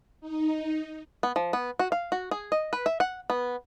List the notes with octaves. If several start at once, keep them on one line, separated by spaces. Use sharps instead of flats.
D#4
B3
F3
B3
F#4
F5
F#4
G#4
D#5
B4
E5
F#5
B3